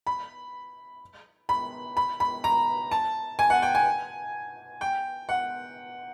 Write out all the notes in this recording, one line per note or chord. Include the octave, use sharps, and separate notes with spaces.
B5
B5
B5
B5
A#5
A5
G#5
F#5
G5
G#5
G5
F#5